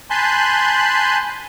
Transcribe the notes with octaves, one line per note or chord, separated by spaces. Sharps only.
G#5 A5 B5 C6 F#6 G6